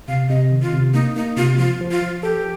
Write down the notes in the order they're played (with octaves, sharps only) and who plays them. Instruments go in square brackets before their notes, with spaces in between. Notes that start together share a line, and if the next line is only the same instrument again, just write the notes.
[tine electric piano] C3 [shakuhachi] F5
[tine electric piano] C3 [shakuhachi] D#5
[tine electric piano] D#3
[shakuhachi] F4
[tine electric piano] C3
[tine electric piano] A#3 [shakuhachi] D#4
[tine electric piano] A#3 [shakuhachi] D#4
[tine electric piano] C3 [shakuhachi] F4
[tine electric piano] F3 [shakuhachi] F4
[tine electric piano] F3
[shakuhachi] F4
[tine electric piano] F3
[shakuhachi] G4 [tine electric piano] A4